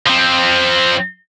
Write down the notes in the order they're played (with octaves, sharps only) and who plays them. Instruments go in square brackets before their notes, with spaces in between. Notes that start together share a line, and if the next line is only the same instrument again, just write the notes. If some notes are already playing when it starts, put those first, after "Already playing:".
[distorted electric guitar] F3 C4